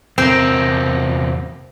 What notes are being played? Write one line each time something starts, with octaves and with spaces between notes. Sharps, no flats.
E2 C3 C4 A#4